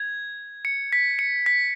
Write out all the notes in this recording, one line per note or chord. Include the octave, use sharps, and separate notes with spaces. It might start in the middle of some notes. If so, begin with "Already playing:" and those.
Already playing: G#6
C#7
B6
C#7
B6